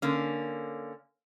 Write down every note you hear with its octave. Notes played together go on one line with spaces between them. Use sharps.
D3 A#3 C#4